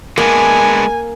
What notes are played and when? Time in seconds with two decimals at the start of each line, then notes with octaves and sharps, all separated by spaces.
0.18 G#3 A#3 B3 D4 G#5